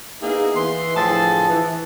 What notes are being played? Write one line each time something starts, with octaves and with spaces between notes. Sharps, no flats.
A#3 B3 D#4 E4 G#4
E3 C6
A2 D3 F3 G#4 A5
E3